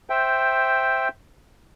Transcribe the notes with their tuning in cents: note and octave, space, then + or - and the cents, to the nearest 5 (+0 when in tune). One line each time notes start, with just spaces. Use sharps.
C5 +5 E5 +0 G5 +0